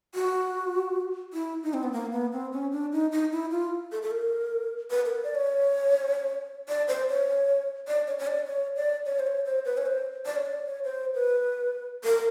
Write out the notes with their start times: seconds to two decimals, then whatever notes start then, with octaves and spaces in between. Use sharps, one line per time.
0.15 F#4
1.33 E4
1.64 D#4
1.74 C4
1.83 B3
1.93 A#3
2.12 B3
2.32 C4
2.53 C#4
2.72 D4
2.93 D#4
3.12 D#4
3.32 E4
3.51 F4
3.92 A4
4.02 A4
4.11 A#4
4.90 B4
5.06 A#4
5.24 D5
5.35 C#5
6.69 D5
6.88 C5
7.09 C#5
7.88 D5
8.08 C#5
8.19 C#5
8.27 D5
8.47 C#5
8.76 D5
9.06 C#5
9.19 C5
9.27 C#5
9.46 C5
9.65 B4
9.78 C#5
9.86 C5
10.26 D5
10.36 C#5
10.46 D5
10.65 C#5
10.84 C5
11.15 B4
12.04 A#4